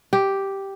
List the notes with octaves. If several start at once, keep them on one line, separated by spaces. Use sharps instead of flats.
G4